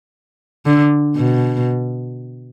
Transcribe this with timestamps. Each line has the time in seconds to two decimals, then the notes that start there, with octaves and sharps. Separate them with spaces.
0.66 D3
1.16 B2